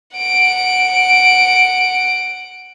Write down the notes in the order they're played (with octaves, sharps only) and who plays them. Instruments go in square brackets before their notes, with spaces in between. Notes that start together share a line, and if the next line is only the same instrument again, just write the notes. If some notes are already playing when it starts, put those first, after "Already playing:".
[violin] F#5 D7